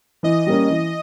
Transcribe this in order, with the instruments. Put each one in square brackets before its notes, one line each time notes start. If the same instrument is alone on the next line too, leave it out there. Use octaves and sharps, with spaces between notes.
[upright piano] E3 [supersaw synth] D#5
[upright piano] G3 A#3 C#4
E3